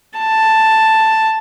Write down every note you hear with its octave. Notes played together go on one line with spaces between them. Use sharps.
A5